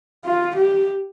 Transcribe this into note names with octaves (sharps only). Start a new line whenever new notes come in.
F4
G4